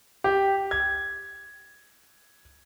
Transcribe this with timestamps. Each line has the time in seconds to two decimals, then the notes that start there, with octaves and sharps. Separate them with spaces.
0.24 G4
0.71 G#6